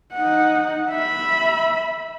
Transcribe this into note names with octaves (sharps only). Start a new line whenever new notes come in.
D#4 F#5
E5 B5